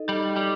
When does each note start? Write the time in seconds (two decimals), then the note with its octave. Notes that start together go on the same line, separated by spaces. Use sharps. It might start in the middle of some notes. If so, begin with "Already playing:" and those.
Already playing: D#4 A4 D#5
0.09 G3
0.36 G3